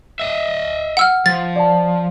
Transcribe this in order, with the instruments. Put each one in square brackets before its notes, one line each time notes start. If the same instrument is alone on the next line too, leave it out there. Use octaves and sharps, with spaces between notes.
[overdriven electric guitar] D#5 E5
[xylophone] F#5 E6 F6
[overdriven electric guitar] F3 [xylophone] A6
[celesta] D5 A5